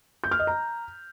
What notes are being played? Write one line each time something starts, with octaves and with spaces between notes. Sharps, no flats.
G6
F6
D#5
A#5